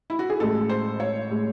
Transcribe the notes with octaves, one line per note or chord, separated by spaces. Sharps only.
E4
F#4
G#4
A1 A2 G#3 A4
C5
C#5
A2 G#3